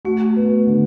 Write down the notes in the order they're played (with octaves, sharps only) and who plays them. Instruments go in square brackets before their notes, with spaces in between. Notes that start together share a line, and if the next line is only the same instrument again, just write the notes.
[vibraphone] A3 [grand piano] F#4
[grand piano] B3
D3